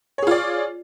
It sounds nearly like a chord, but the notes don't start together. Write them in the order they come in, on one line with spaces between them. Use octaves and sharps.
C#5 G#4 F4 D5